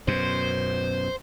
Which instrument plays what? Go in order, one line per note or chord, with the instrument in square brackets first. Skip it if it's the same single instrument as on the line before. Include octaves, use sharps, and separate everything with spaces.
[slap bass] F#2 B2 [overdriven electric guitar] C5